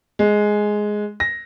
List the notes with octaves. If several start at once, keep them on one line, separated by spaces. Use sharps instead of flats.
G#3
A#6